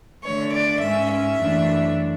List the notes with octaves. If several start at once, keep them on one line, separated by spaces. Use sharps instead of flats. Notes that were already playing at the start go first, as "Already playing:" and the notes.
D3 A3 D4 C#5
D5
G#2 G#3 C#4 E5
E5
F#2 E3 A3 D4